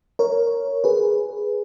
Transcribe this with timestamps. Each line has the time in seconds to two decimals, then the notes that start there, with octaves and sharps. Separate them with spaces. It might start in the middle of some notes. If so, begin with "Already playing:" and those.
0.19 A#4 C#5
0.84 G#4 B4